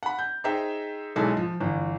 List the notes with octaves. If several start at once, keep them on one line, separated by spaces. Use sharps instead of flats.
F#5 B5
G6
D#4 G#4 C5 E5 G5 A#5
B1 G#3 E4 A4
F3
G1 E3